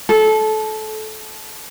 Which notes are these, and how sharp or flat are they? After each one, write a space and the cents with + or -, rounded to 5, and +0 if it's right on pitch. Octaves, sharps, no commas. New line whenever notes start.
A4 -20